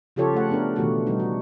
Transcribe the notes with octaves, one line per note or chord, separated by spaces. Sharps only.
C#3 F3 F4 G4 A4 C#5
A3 F#5
B3 D4 A#4
B2 D#3 E3 A3 F#4 G4
B2 G3 D#4
F#4